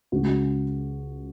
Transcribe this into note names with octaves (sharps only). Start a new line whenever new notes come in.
C#2 C#3 F#4